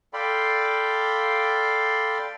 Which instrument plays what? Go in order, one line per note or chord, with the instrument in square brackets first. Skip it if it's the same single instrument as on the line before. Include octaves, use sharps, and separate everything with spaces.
[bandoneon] A4 D5 F5 G5 B5 C6